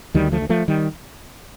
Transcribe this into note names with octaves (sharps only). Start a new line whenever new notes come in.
D2 D#3 G3
F3 A3
D2
F3 A3
D#3 G3